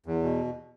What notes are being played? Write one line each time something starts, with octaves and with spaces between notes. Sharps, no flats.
E2
B2